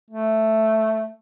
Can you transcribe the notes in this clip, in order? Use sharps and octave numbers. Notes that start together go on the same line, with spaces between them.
A3